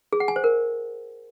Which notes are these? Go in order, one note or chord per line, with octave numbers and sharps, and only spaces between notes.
G#4
F#5
G#5
C5
A#4